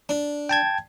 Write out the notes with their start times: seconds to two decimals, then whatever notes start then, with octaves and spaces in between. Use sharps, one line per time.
0.09 D4
0.49 G5 A5 G#6